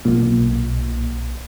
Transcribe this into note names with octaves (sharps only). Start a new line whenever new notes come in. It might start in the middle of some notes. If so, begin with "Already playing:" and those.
B1 A#2